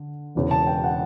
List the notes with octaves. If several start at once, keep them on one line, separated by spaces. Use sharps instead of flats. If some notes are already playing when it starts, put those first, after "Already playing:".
Already playing: D3
E1 E2 C#3
A5
G5
F#5